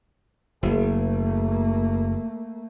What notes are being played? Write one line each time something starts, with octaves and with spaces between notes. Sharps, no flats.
F#1 A3 A#3